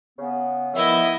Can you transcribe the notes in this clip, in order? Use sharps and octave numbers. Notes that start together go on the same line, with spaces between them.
C#3 B3
D#3 F3 B3 E4 D#5 E5